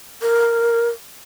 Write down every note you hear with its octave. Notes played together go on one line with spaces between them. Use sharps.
A#4